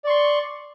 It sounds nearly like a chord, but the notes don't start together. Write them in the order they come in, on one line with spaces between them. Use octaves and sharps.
D5 C#6 C6